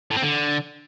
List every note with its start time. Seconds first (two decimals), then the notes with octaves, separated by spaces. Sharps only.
0.11 A2
0.16 C4
0.22 D3